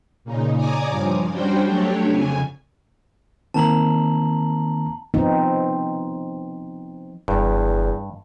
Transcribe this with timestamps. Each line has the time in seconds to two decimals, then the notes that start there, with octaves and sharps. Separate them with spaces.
0.24 A#2 C#3 D#4
0.55 C#5 D5 G#5 A#5 D6 D#6
0.89 G2 F3
1.31 G3 C#4 D4 F#4 C5 G5
1.66 F#3 A3 D4 G4 C#5
2.08 F2 C#3 G#5
3.54 D#3 A#3 C4 A5 A#5 F#7
5.14 F3 B3 C4 D#4
7.28 F#1 E2 G2